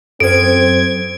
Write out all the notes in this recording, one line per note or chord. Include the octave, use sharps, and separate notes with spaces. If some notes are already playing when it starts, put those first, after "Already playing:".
F#2 C4 A4 C5 G#6 D7